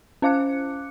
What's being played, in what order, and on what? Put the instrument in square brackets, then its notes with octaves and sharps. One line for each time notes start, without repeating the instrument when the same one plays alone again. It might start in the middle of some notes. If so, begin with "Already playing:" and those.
[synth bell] C#4 C5 F5 D6 F#6 C#7